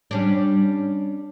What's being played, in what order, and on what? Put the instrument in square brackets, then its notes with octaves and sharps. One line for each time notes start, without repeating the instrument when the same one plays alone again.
[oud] G3 C#4 D4